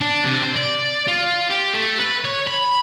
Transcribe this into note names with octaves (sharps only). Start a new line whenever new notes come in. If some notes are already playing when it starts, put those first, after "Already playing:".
D4
C3
C5
D5
F4
G4
A3
B4
C#5
B5